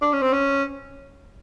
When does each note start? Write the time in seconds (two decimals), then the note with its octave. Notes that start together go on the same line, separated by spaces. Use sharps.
0.02 D4
0.13 C#4
0.22 C4
0.33 C#4